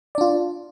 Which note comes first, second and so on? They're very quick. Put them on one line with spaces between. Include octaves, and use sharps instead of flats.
D5 D4 F4